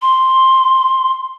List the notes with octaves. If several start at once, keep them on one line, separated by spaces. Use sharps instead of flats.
C6